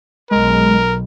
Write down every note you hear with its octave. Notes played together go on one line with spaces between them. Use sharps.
B1 G#3 A#4